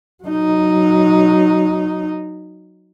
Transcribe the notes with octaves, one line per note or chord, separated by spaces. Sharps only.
F#3 D#4